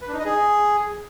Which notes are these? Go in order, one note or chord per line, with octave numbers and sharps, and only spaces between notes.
B4
D4
D#4
D#5
G#4